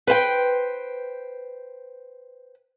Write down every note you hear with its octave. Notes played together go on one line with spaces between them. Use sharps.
B4 C5 E5 G5